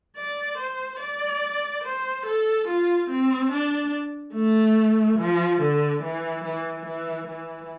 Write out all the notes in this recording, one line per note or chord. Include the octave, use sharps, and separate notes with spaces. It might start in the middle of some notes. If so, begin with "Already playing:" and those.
D5
C5
D5
C5
A4
F4
C4
D4
A3
F3
D3
E3
E3
E3
E3